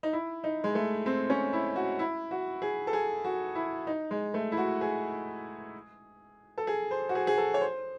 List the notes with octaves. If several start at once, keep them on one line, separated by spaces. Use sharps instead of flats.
D#4
E4
D#4
G#3
A3
C4
C#4
E4
F#4
E4
F#4
G#4
A4
G#4
F#4
E4
D#4
G#3
A3
E4
F#4
G#4
A4
G#4
C5
F#4
G#4
G#4
A4
C#5
C5